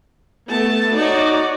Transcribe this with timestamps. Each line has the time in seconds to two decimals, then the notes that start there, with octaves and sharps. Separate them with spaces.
0.49 A3 B3 A5
0.96 D#4 F#4 C#5 D5